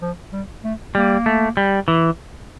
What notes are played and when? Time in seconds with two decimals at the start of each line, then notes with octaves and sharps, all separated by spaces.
0.02 F3
0.33 G3
0.64 A3
0.95 G3 A#3
1.26 A3
1.57 G3
1.88 E3